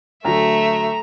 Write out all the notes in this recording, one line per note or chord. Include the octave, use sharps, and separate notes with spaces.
D2 F#3 A3 E5 A#5